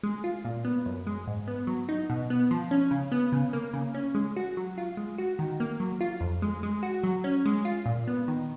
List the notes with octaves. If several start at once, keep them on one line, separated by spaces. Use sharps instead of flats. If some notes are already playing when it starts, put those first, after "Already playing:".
G#3
F4
A#2
B3
F#2
G#3
G#2
B3
F#3
D#4
B2
B3
F3
C#4
C#3
B3
C#3
A#3
C#3
C#4
G#3
F#4
F#3
F4
G#3
F#4
D#3
A#3
F#3
F4
F2
G#3
G#3
F#4
F#3
C#4
G#3
F4
A#2
B3
D#3